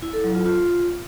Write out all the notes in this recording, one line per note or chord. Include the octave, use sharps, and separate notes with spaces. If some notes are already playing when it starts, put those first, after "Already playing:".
E4
A4
F#3
F4
F4